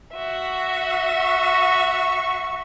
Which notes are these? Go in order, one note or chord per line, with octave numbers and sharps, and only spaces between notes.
F#4 E5
C#6